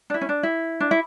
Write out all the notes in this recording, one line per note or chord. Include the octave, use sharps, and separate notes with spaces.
D4
E4
C#4
D4
E4
D4
E4